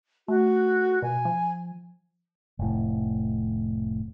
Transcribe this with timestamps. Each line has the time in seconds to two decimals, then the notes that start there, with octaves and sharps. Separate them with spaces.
0.28 A3 F#4
1.02 B2 G#5
1.25 F3
2.59 F1 A2